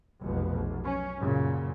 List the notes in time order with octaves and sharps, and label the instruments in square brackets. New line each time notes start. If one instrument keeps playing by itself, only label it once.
[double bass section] F1 B1 B2
B1
C#4
F#2 A#2 C#3